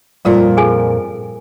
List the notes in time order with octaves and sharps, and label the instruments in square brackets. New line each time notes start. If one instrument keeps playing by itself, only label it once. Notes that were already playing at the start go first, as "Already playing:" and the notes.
[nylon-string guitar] F2 A#2 A#4 [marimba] G3 F4 D5
[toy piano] G#4 A4 G#5